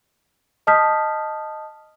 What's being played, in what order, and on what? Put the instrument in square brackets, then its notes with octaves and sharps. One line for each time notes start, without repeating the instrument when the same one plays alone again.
[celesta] D#5 A5 D#6 F6 G6 B6